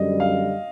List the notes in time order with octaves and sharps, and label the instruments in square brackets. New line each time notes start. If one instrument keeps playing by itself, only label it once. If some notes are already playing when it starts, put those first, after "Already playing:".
Already playing: [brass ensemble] F#2 D3 G3 [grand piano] D#5
[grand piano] F5